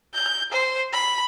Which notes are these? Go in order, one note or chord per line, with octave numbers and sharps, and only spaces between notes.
G6
C5
B5